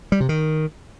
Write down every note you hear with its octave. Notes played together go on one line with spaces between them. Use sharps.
G3
C3
D#3